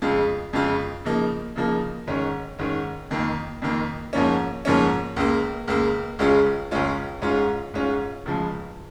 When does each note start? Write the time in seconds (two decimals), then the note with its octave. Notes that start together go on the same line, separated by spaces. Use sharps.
0.02 F2 C#3 G#3 F4
0.53 F2 C#3 G#3 F4
1.05 C#3 F3 A#3 D#4
1.56 C#3 F3 A#3 D#4
2.07 G#2 D#3 C#4
2.59 G#2 D#3 C#4
3.11 F2 D#3 A#3
3.62 F2 D#3 A#3
4.13 G#2 F3 A#3 C#4
4.65 G#2 F3 A#3 C#4
5.16 C#2 C#3 A#3
5.67 C#2 C#3 A#3
6.19 C#2 C#3 G#3 C#4 F4
6.71 C#2 C#3 G#3 C#4 F4
7.22 G#2 G#3 C#4 F4
7.74 G#2 G#3 C#4 F4
8.26 C#2 C#3 F3 G#3